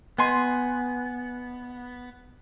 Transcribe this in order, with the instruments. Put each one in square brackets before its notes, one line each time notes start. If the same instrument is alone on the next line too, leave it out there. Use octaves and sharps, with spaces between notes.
[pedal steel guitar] B3 [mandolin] D#5 G#5 C6